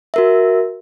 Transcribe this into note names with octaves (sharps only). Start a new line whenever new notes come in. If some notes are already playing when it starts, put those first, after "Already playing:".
F#4 A#4 E5